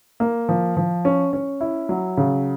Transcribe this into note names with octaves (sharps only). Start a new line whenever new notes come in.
A#3
F3
F3
C#4
C#4
E4
F#3
C#3